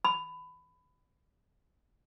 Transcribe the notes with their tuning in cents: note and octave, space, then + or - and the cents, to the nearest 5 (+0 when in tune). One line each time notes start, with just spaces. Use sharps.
B5 +20